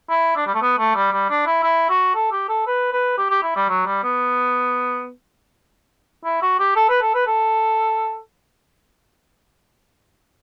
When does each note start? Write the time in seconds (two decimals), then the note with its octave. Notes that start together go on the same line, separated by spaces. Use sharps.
0.10 E4
0.37 D4
0.47 G3
0.55 A3
0.62 B3
0.78 A3
0.95 G3
1.13 G3
1.30 D4
1.46 E4
1.63 E4
1.90 F#4
2.15 A4
2.32 G4
2.49 A4
2.67 B4
2.93 B4
3.18 G4
3.30 G4
3.43 E4
3.56 G3
3.69 F#3
3.86 G3
4.04 B3
6.25 E4
6.43 F#4
6.60 G4
6.76 A4
6.89 B4
7.02 A4
7.15 B4
7.27 A4